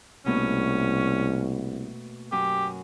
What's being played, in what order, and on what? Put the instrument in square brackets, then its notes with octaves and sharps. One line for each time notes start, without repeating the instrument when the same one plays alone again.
[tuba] C2 [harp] B2 A3 A#3 [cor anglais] C#4
[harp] F#2 [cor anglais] G4